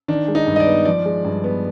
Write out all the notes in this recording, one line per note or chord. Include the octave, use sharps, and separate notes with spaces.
D#3 D4
G#3
D#4
G2
D#5
D5
B3
F3 D5
G#3
G2
B3